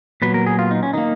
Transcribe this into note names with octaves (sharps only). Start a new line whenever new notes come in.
A#2 F#3 B3 B4
A#4
G#4
F4
D#4
C#4
D#3 A#3 D#4